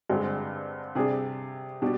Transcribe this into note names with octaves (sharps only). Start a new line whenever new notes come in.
G2 D3 G#3 C4
C3 G3 D4 G#4
B2 G3 D4